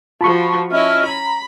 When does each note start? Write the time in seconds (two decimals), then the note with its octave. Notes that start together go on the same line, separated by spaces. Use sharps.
0.21 F3 F4 F#4 A5 B5 C#6
0.71 C#4 E4 D#5 E5 F6
1.06 A#5 B5